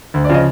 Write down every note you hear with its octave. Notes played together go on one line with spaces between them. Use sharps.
D2
D5
C#3 F3 D#5